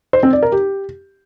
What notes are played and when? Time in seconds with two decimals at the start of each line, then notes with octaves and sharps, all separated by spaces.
0.13 C5
0.23 C4
0.33 D5
0.43 A#4
0.52 G4